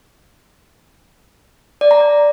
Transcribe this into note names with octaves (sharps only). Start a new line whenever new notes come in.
D5
A#5
D5